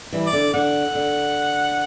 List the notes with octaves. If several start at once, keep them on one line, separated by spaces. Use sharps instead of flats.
E3 G3
D5
D3
D3 F#5
D3